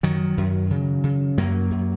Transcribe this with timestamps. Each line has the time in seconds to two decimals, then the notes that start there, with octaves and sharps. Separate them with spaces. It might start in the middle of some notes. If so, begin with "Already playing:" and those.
0.03 F#2 D#3 F#3
0.37 F#2
0.71 C#3
1.04 C#3
1.37 F#2 F#3 A#3
1.71 F#2